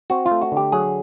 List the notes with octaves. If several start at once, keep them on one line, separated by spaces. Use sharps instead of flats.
C4 F#4
F4
A3
F#4
D3 G4
F#3 G#4